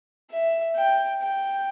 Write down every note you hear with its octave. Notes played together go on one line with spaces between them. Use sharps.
E5
G5
G5